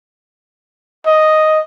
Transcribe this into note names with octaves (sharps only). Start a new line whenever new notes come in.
D#5